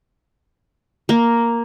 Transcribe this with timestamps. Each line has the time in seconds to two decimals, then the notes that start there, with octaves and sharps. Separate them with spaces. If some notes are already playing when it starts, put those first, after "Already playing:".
1.09 A#3